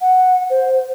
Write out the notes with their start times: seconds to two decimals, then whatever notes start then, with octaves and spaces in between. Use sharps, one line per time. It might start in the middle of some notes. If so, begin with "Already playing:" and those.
0.01 F#5
0.50 C5